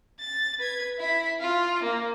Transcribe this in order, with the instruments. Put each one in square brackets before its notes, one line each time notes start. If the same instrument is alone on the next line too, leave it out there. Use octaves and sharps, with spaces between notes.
[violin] A6
B4 G#6
E4 B5
F4
A#3